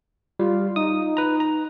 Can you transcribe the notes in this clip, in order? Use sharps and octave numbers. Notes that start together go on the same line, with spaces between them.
G3 F4
D#4 D#6
B4 A#5
A#5